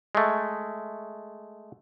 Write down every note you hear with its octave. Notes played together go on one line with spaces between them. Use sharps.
G#3 A3